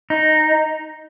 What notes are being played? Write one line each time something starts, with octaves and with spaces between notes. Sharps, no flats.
D#4